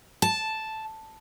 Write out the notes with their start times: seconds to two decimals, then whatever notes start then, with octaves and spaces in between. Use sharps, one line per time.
0.22 A5